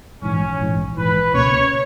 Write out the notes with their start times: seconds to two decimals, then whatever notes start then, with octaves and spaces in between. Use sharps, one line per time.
0.22 A#1 G#2 E3 C#4
0.59 A#1 G#2 E3
0.96 A#1 G#2 E3 B4
1.33 C#2 B2 A#3 C#4 C#5